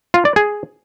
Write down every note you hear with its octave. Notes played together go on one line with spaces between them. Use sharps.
F4
D5
G#4